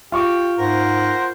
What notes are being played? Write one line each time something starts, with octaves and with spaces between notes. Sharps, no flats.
F4 G4 C#6 D6
G#2 A#4 C5 F#5